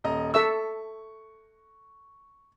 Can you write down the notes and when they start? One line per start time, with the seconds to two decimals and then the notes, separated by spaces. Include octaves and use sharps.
0.04 D#1 D#5 A#5
0.34 A4 E5 C#6 E6